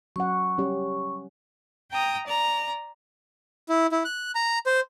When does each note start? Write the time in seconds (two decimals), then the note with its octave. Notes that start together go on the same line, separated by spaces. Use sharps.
0.16 F#3 C#4 F#5 C#6
0.58 G3 C#4 G4
1.90 G5 A#5 D#6
2.26 D5 A#5
3.69 E4
3.92 E4
4.05 F#6
4.35 A#5
4.66 C5